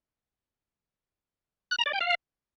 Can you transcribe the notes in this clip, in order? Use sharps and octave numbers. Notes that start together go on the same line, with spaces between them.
F#6
A#5
D5
G5
F5